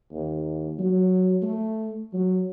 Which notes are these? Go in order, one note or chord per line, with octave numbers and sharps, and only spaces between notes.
D#2
F#3
A3
F#3